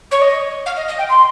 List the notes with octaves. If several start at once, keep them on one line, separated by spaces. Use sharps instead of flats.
C#5
D#5
F5
D#5
D#5
G5
C6